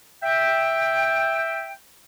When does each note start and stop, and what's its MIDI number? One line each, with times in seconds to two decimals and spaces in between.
0.23 1.72 76
0.23 1.72 79